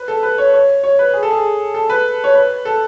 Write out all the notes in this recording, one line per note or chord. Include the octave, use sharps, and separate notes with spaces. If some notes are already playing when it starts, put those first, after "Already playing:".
Already playing: B4
A4
B4
C#5
C#5
C#5
B4
G#4
A4
G#4
A4
B4
C#5
B4
A4